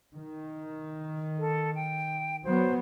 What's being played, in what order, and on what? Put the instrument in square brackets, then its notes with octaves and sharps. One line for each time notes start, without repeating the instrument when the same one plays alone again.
[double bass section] D#3
[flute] A4
G5
[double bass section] F#3 B3 [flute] C5